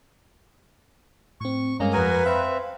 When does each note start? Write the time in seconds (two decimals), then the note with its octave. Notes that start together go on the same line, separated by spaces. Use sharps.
1.41 A2 C4 C#6
1.80 G2 G#3 A#3 C#4 G#4 A#5
1.93 F2 F#4 A#4 B4 G#5 A#5 D#6
2.26 C4 E5 F5 B5